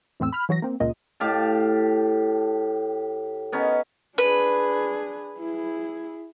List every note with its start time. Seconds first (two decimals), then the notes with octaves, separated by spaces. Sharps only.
0.20 E2 A2 C4 E6
0.33 B5 F6
0.49 E3 F#3 F#4 A#6
0.62 A#3 C4
0.80 C#2 A#2 D#5
1.20 A2 G4 F5 A5
3.52 B3 C#4 D#4
4.18 D4 G#4 B4
5.38 E4 G#4